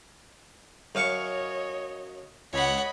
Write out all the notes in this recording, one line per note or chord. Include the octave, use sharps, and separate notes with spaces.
F#2 C#5 D#5 F5 C#6
C#2 C#5 D#5 F#5 B5